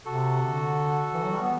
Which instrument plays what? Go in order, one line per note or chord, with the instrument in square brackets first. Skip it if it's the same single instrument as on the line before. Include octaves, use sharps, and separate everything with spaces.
[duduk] C3 [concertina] F#4 A4
[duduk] D3
E3
F#3
G3
B3